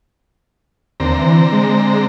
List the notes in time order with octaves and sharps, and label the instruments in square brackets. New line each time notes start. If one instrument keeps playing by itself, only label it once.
[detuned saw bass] D#2 [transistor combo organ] D3 C4 A#5
[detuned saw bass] E3
G#3